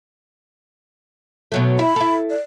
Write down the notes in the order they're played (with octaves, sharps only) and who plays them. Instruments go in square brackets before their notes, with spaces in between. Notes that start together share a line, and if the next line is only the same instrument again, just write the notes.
[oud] B2 F#3 A3
[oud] E4 [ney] B5
[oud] E4 A4
[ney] D5